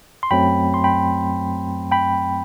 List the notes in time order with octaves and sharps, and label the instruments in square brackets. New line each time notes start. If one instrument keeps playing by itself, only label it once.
[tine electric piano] C6
F#2 F#3 A3 C4 G5 B5
C6
G5 B5
G5 B5